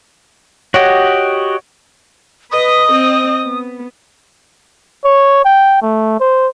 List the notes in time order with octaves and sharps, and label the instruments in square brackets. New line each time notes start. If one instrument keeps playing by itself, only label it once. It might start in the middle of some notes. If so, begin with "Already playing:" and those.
[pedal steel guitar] F#4 G4 D#5 [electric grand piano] C#5 F#5
[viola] B4 [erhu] D#5 [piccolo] D#6
[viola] C4
B3
[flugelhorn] C#5
G5
A3
C5